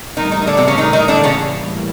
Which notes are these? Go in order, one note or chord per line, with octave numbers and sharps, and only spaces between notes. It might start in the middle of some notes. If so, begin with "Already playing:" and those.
A2 D#3 E3 G3 A#3 D#4
D#3 D#4
D#4
D3 D4
C3 C4
C#3 C#4
D#3 D#4
D#3 D#4
D3 D4
C#3 C#4